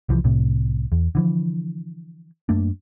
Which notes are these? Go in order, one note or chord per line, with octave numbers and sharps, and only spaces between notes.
C2 E3 F3
C2 A2 C3
E2
D3 E3 F3
F#2 A3 A#3 D4